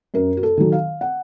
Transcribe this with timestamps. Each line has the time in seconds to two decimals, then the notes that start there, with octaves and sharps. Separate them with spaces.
0.14 F#2 A#4
0.37 F#4
0.43 A4
0.57 D#3 F#3
0.72 F5
1.01 F#5